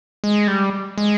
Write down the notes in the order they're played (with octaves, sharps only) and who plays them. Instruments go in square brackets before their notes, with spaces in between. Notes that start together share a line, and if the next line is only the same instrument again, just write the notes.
[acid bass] G#3
G3
G#3